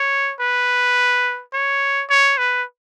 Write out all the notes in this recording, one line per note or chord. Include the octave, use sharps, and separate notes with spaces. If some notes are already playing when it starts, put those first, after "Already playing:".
Already playing: C#5
B4
C#5
C#5
B4